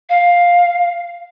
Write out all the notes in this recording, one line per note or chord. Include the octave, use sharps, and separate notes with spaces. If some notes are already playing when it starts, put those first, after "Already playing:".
F5